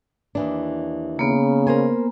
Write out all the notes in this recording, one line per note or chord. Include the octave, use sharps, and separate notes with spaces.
D#2 E3 D4
C#3 A#3 B3
A#4 C5 G#5